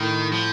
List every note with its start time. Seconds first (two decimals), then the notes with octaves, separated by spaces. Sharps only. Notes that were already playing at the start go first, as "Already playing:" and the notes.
Already playing: A2 D#3
0.32 F3